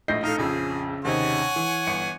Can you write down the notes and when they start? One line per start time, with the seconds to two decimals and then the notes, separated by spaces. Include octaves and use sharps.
0.08 A#1 A2 D#5 G6 A#6 C7
0.24 D#4 A4 F5
0.38 A#1 F2 C#3 G#4 E6
1.05 D#2 C3 D#4 C#5 F#5 G#5
1.56 E3
1.87 G1 C#7